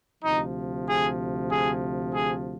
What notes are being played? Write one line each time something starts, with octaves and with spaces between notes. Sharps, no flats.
D2 C3 F3 D#4
G#4
G#4
G#4